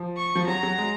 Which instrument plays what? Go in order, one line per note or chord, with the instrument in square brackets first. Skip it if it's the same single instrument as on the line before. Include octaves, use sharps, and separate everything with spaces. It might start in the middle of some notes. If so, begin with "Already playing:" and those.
Already playing: [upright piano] F3
[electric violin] C#6
[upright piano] F3
[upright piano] F#3 [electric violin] A#5
[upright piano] F#3
G#3